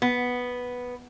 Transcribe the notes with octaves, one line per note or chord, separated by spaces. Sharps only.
B3